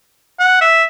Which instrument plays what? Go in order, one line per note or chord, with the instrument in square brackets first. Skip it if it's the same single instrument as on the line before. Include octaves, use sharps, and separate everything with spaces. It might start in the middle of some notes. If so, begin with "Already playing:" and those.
[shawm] F#5
E5